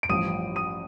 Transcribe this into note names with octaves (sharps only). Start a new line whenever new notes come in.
D7
A1 G2 F3 D#6 D#7
D#6 D#7